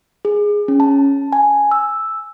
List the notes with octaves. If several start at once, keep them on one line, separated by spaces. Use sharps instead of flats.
G#4
C#4
A5
G#5
E6